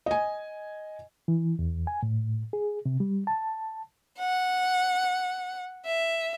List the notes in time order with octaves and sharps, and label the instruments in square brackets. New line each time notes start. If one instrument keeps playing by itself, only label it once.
[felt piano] D#5 G#5
[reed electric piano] E3
E2
G#5
A2
G#4
C3
G3
A5
[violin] F#5
E5